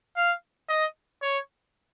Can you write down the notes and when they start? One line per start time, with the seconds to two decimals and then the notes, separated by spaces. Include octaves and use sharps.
0.16 F5
0.69 D#5
1.22 C#5